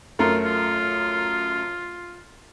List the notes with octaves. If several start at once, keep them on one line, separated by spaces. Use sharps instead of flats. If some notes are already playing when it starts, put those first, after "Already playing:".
F#2 A3 F4 A#4
F4